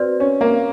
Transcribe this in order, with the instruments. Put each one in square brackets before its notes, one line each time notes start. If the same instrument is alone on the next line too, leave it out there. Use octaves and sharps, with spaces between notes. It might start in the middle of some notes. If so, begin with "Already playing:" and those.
Already playing: [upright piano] C4 [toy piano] F#4 B4 D5
[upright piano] C#4
A#3